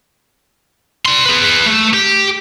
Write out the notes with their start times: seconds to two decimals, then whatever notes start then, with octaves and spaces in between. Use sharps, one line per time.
1.06 D5 C6
1.26 G#4 B4
1.66 A3
1.94 G4